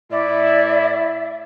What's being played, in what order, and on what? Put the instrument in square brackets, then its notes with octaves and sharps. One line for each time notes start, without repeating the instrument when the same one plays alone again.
[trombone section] A2 E4 [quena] D5 [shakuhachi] E5